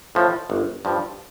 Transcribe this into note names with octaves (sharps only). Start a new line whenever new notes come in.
A2 F3
G1
G2 F3